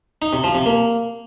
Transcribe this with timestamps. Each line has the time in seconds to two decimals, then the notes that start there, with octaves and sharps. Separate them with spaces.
0.22 D#4
0.33 C3
0.44 F3
0.55 C3
0.66 A#3